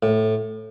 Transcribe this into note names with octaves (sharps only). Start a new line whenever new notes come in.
A2